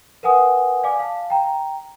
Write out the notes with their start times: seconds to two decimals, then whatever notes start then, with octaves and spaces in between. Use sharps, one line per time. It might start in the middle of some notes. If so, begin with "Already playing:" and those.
0.23 A#4 B4 F#5 G#5 D#6
0.83 D5 F5 G#5 D6
0.99 F5 A5
1.30 G5 A#5